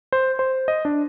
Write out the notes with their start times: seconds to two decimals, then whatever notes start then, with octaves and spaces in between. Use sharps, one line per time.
0.13 C5
0.39 C5
0.68 D#5
0.85 D4